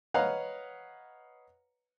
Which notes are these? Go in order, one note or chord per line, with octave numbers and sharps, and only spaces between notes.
B4 C#5 D#5 F5 F#5 A#5